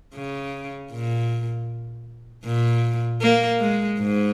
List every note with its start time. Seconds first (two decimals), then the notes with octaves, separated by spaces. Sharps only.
0.15 C#3
0.92 A#2
2.45 A#2
3.21 A#3
3.60 G#3
3.99 G#2